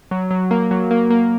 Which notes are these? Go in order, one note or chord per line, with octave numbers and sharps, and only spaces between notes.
F#3
F#3
A#3
F#3
A#3
A#3